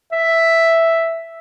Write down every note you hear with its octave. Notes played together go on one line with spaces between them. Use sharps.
E5